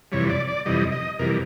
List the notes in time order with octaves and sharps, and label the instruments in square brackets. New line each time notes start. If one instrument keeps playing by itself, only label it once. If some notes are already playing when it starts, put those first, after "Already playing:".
[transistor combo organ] F2 C3 E3 G3 C#5
D5
D5
F2 C3 E3 G3 D#5
D#5
F2 C3 E3 G3 A#4